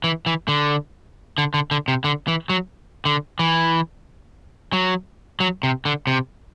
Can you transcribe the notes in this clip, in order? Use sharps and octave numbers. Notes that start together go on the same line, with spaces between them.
E3
E3
D3
D3
D3
D3
C3
D3
E3
F#3
D3
E3
F#3
F#3
C3
D3
C3